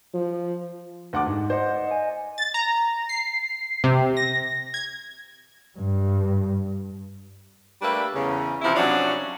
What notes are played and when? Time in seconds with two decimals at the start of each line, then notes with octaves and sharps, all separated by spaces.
0.14 F3
1.13 D2 F#5 D6
1.26 G#2
1.50 C5 D5 D#5 F#5
1.74 D5
1.87 D#5 G#5
2.38 A6
2.54 A#5
3.09 C7
3.84 C3
4.17 A#6
4.74 G#6
5.78 G2
7.82 G3 A3 A#3 D4 B4
8.14 E2 C#3
8.62 C3 E3 F3 E4
8.75 C3 F3 F#3 C#4 D4